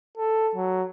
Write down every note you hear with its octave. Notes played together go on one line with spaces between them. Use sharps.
A4
F#3